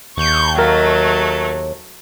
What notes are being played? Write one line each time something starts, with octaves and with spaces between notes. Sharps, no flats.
D#2 C#6 G6
F#3 A3 A#4